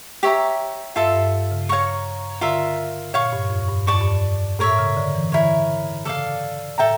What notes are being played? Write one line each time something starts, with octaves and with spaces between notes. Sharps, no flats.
G4 C#5 E5 A#5
G2 F4 A4 E5 A5
G2
C#3
C#5 F5 A#5 C#6
D3 F4 A#4 E5
A#2 C#5 F5 C#6
G2
F2
G2
G2 D5 A5 C#6
F2
G2
A2 A#4 C#5 E5
C#3
D3
E3
D3 E4 A#4 C#5
C#3 A4 D5 F5
A2 A4 E5 G5 A#5